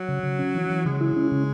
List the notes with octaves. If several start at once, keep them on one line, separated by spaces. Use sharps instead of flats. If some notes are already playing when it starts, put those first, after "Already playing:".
Already playing: F#3
C#3
C#3
C#4
E3
E3
C#3 G#3
E4
C#4
C#3